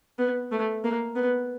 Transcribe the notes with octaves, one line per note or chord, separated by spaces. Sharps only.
B3
A3
A#3
B3